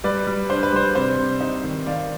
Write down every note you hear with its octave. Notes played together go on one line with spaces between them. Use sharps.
G3 B4 D5
G3
D4 C5
B4
G3 C5
C3 C5
C3
D#4
D#3
D#3 D5 F5